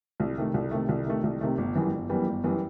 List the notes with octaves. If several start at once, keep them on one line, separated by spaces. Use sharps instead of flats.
C2
C3 D#3 A3
C2
C3 D#3 A3
C2
C3 D#3 A3
C2
C3 D#3 A3
G1
F#2 E3 G3 B3
G1
F#2 E3 G3 B3
G1
F#2 E3 G3 B3